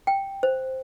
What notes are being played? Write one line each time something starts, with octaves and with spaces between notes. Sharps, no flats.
G5
C5